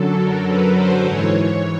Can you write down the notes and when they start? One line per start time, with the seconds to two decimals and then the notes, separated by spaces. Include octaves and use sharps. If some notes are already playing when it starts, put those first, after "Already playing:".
Already playing: F#2 D3 F#3 A4
0.19 A#4
0.47 B4
0.75 C5
1.03 G#2 E3 C#5
1.33 C#5